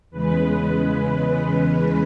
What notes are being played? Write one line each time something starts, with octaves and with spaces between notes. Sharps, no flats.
E2 C#3 G#3 B4